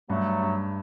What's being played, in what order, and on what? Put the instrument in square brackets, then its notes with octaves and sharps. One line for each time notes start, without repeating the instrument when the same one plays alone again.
[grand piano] G2 [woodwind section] F#3 A3
[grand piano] G2